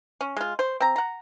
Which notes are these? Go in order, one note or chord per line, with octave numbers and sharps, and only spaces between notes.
C#4
G#3 F4
C5
C4 A#5
F#5 A#5